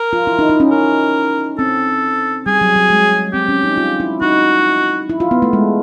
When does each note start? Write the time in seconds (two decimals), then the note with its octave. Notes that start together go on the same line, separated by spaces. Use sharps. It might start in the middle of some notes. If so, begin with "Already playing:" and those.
Already playing: A#4
0.13 F4
0.27 E4
0.39 D#4
0.49 D#4
0.60 C#4
0.71 A#4
1.58 C4 A4
2.46 G3 G#4
2.61 F#3
2.76 F#3
2.90 G#3
3.34 C4 G4
3.49 C#4
3.64 D#4
3.78 F4
4.00 E4
4.21 D#4 F#4
5.09 E4
5.20 F4
5.31 B3
5.42 A3
5.53 G#3